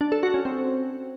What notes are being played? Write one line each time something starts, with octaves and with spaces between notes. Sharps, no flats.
D4
A4
F#4
C#4
C4